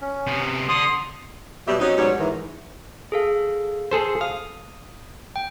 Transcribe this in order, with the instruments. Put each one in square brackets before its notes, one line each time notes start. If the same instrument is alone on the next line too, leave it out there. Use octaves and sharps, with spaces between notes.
[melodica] C#4
[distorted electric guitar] C3 B3
[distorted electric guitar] D3 [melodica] C6 D#6
[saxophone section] B2 F#3 G3 G4 E5
F#3 C4 C#4 D#4
G#2 B2 F#3 G3 C#5
G#2 D#3 E3
[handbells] G#4 A4 F5
[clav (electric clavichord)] G#4 A4 C5
[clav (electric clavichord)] F5 [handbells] D#6
[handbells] G5